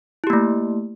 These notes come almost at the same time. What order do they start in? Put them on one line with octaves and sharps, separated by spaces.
E4 G4 A#3 A3